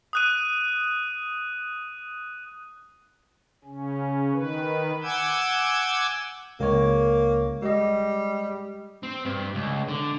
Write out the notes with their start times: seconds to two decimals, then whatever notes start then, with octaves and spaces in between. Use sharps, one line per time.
0.13 D#6 F#6 D#7
3.64 C#3 C#4
4.32 D#3 B4
5.02 F#5 G#5 D6 E6 G6 G#6
6.60 C#2 A#3 C#5
7.62 G3 G#3 D#5
9.03 C4
9.25 G2
9.55 C#2
9.88 D3